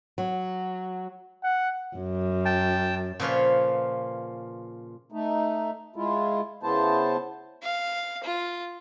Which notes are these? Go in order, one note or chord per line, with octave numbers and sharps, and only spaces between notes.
F#3
F#5
F#2
G5 A5
A#2 C#3 F3 F4 B4 C#5
A3 D#4
G#3 E4 F4
C#3 B3 E4 C5 A5
F5
F4